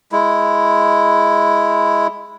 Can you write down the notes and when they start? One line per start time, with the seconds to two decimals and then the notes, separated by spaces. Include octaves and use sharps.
0.12 G#3 E4